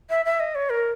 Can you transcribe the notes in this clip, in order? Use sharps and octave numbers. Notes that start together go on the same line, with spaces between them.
E5
E5
D#5
C#5
A#4